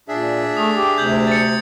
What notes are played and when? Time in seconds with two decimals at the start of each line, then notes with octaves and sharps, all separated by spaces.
0.08 A#2 D4 G#4 E5
0.57 A3 D#6
0.76 G4
0.98 D2 C3 G6 G#6 F#7
1.27 A6 C#7